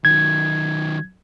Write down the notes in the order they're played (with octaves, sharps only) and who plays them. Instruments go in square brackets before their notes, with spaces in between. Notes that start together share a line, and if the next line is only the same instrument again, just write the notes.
[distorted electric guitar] D#3 F#3 [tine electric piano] G#6